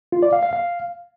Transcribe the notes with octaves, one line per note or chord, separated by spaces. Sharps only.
F4
D5
F5
F5
F5